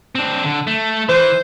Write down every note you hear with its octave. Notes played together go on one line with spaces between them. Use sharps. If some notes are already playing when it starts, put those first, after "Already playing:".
C4 D4
D3
A3
E3 C5